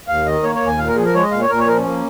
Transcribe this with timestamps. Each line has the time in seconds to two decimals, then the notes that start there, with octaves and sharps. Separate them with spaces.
0.08 D#2 F5
0.26 D#3 D#5
0.43 A#3 C#5
0.55 C#5
0.61 D#2
0.67 G#5
0.78 A#2 F5
0.87 A#4
0.96 F3 G#4
1.05 A#4
1.14 G#3 C#5
1.23 D#5
1.31 A#2 F5
1.41 C#5
1.49 A#2 A#4
1.59 C#5
1.67 F3 A#4
1.76 C#4
1.85 A#3